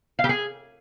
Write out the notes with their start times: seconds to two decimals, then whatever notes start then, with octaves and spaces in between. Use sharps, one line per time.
0.19 F5
0.24 G4
0.29 G#4